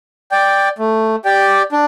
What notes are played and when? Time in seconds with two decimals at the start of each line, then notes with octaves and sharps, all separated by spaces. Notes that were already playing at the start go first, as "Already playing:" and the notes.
0.31 D5 G5
0.79 A3
1.25 G4 D5 G5
1.72 D4